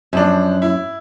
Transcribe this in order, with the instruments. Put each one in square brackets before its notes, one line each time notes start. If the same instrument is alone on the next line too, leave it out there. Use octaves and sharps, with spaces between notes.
[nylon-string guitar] F#2 [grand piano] F3 D4
[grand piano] E4